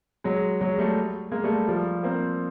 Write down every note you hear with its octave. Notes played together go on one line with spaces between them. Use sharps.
F#3 G#3
F#3 G#3
G3 A3
G#3 A#3
G3 A3
F3 G3
A#3 C4